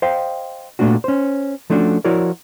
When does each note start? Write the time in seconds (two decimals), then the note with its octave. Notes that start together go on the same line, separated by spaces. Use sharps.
0.02 C5 D#5 F5 G5
0.79 A#2 D#3 A3 B3 D4 F#4
1.04 C#4 C5
1.70 F3 A3 C#4 D4 F4 F#4
2.05 F3 E4 F#4 A#4 C#5 D5